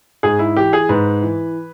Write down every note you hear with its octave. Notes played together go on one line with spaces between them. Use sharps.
G#2 G#4
E4
E3 G4
G#4
G#2 B4
E3